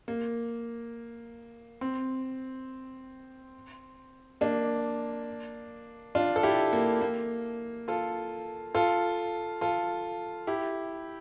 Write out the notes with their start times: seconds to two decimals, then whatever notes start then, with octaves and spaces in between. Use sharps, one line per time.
0.08 A#3
1.81 C4
4.41 A#3 D4
6.15 D4 F4
6.36 A4
6.43 E4 G4
6.73 A#3
7.01 A#3
7.88 F4 A4
8.75 F4 A4
9.61 F4 A4
10.47 E4 G4